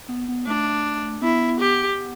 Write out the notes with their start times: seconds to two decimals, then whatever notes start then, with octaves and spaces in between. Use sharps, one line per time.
0.08 B3
0.28 B3
0.47 A3 D4
1.22 B3 E4
1.60 G4